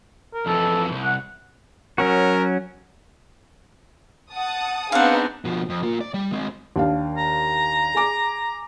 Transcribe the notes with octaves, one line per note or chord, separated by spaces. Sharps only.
A#4
F2 E3 A4
C2
F#5
F#3 C#4 F#4 A#4
F#5 A5 D#6
B3 C4 D4 D#4 G#4 F5 F#5
B2 F3
F2
A#3 F4
D5
G3
G#3 C4
D#2 D4 F5
A#5
G#4 G#5 D6